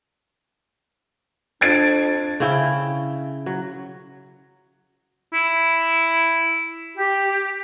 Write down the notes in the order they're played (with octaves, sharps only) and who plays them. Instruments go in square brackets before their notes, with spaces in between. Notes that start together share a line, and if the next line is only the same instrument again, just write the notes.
[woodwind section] F2 D4 [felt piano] G#6 A6 D7
[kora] C#3 C#4 E4 G5
F#3
[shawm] E4
[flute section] G4